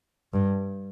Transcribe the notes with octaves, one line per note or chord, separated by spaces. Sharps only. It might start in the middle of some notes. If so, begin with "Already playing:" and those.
G2